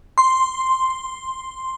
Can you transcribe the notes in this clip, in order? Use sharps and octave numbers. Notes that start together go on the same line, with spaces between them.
C6